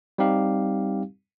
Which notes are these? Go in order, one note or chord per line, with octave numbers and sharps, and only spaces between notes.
G3 C4 D#4 G4 F5